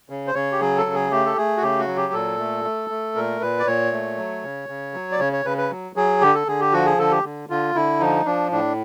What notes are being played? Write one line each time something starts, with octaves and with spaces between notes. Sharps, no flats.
C#3
C5
C#3 C#5
G4
F#3 G#4
A4
C#3
G#4
A3 G4
A4
A3 G#4
F#4
C#3 G4
F#4
F#3
G4
A#2 A4
A3
A3
A3
A#2 A#4
A#2 B4
D5
A#2 C#5
A3
F#3
C#3
C#3
F#3
D5
C#3 C#5
C#5
C#3 B4
B4
F#3
F#3 G#4
D3 G4
A4
D3 G#4
G4
F3 F#4
G#4
D3 A4
G4
D3
D3 F4
D3 E4
F3 D#4
F3 D4
A2 D4